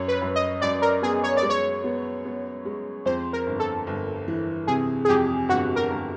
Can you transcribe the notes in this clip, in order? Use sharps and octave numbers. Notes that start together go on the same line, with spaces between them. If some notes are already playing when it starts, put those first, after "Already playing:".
Already playing: F#2 C#5
B4
F#2
D#5
F#2 D5
A#4
B3 G#4
C#5
D5
G#3
C#5
B3
B3
G#3
F2 C5
A#4
G1
A4
G1
E3
C3 G#4
G#4
F2 G4
G1 F#4
A#4
G1